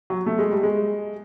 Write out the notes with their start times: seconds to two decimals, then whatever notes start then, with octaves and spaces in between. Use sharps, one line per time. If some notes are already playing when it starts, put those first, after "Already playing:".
0.10 F#3
0.26 A3
0.39 G#3
0.51 G3
0.63 G#3